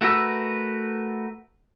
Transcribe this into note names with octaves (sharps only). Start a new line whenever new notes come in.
A3 F#4 A#4 B4 E6